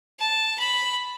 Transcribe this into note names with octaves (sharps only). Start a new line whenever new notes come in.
A5
B5